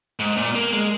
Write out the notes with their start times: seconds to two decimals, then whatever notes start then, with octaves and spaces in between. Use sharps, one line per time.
0.20 G#2
0.37 A#2
0.55 A#3
0.73 G#3